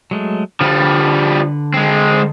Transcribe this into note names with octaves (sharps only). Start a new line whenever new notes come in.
F#3 G#3 A3
D3 F3 G3 B4
G#3 C4